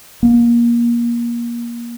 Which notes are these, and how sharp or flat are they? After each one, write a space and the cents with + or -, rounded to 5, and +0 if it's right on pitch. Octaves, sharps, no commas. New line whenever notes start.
A#3 +25